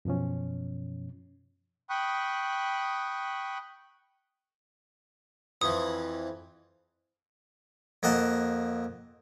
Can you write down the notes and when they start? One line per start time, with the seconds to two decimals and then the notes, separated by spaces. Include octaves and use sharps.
0.05 F#2 B2 F3 C#4
1.90 G5 B5 C#6 D#6 F#6
5.61 F2 E3 F3 D#6
8.03 F2 A#3 D#5 F#5 A5